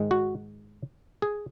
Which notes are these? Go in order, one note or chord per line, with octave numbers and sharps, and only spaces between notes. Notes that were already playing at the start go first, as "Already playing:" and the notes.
Already playing: G#2 D#3 G#3
F#4
G#4